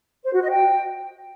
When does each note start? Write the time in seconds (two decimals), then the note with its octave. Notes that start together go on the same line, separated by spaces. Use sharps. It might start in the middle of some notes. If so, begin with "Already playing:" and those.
0.24 C5
0.33 F#4
0.42 D#5
0.51 G5